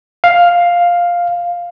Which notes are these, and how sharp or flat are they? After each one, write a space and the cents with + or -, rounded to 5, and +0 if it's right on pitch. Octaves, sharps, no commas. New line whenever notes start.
F5 +5